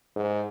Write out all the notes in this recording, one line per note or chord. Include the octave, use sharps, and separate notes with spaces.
G#2